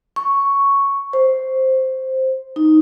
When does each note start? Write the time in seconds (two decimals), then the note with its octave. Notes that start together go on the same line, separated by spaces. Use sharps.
0.16 C#6
1.13 C5
2.56 D#4